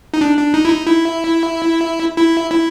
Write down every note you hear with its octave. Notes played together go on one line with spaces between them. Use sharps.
D#4
D4
D4
D#4
E4
D#4
E4
E4
E4